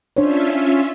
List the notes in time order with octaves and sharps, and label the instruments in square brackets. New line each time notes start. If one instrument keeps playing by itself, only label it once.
[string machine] C#4 F4 E5 [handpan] D4 C5 C#5